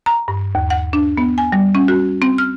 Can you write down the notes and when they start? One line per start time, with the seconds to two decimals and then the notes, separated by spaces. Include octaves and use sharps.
0.06 A#5
0.28 G2
0.55 D#2
0.70 F#5
0.93 D4
1.17 B3
1.38 G#5
1.52 G3
1.75 C#4
1.88 F#4
2.22 C4
2.38 F6